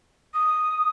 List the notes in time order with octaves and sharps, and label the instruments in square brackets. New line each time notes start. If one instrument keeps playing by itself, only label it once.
[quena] D#6